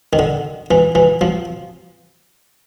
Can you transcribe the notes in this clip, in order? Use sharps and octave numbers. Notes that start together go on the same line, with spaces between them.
D#3
D3
E3
E3
F3